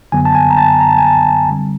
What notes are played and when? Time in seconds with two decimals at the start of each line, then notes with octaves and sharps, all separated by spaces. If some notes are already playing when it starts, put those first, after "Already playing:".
0.12 F#2 D3 F#3 B3 G#5
0.25 A5
0.35 G#5
0.50 A#5
0.57 A5
0.80 A#5
0.89 A5
0.98 G#5
1.07 A5
1.48 D3 G3 C4